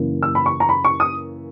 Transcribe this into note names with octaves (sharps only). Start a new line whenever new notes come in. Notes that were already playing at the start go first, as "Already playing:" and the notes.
Already playing: F#2 C#3 E3 A#3
E6
B5
C#6
A#5
B5
C#6
D#6